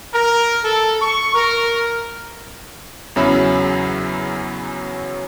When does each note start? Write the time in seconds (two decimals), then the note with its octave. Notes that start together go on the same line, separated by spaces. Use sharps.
0.14 A#4
0.64 A4
1.02 C#6
1.35 A#4
3.16 E2 C#3 F#3 C#4 E5 B5